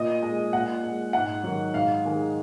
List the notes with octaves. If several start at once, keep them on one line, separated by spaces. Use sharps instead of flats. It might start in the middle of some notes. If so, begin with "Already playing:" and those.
Already playing: A#2 D#5
G#3
A#2 F#5
G#3
G#2 F#5
D#3 F#3
G#2 F5
D#3 G#3